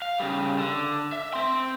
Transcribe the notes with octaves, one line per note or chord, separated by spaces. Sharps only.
F5
C#3 G3
D3
E5
C4 C6